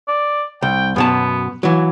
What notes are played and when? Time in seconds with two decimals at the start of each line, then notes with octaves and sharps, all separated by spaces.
0.08 D5
0.62 C2 G5
0.96 F#2 B2 B3 A5
1.63 E3 F#3